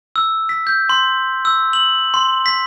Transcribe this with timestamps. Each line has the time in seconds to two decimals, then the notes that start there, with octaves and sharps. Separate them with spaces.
0.16 E6
0.49 B6
0.67 G6
0.89 C6
1.45 E6
1.73 F#7
2.14 C6
2.46 B6